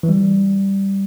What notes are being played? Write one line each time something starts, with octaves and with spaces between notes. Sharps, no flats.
E3
G3